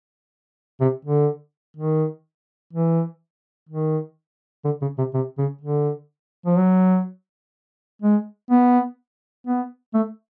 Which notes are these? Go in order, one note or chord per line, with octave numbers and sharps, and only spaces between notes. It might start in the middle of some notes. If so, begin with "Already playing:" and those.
C3
D3
D#3
E3
D#3
D3
C#3
C3
C3
C#3
D3
F3
F#3
G#3
B3
B3
A3